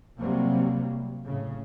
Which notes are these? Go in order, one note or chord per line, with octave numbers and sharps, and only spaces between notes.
C3 F#3 G3 A#3
A2 C#3